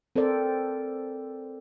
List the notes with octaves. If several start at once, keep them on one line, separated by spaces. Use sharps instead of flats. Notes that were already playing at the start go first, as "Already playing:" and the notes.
C4 A4 A#4 C5 D5